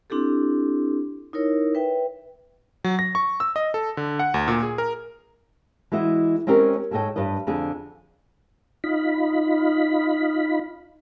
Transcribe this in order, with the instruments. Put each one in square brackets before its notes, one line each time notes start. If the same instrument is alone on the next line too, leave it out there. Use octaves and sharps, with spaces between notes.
[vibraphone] C4 D4 E4 G4 A4
D#4 E4 A#4 C#5
B4 E5 G5
[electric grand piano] F#3
A#6
C#6
E6
D#5
A4
D3
F#5
D2
A#2
G#4
A#4
[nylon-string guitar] E3 G#3 B3 E4 F#4 D#5
G#3 C4 C#4 G4 A#4
G#2 G#4 A4 C#5 D#5 G5
G2 G3 B4 D#5
F2 D3 G#4
[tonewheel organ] D#4 F4 B5